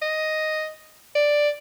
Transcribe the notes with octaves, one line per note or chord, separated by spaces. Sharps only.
D#5
D5